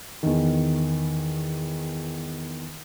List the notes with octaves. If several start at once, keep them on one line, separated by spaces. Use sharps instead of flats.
E2 D#3